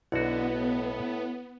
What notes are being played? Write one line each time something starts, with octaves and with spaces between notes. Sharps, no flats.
B1 D3 B3 E4 F#4
A2